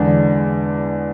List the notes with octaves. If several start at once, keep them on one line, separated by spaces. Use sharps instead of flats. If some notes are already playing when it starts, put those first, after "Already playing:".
Already playing: E2 D3 G#3 D4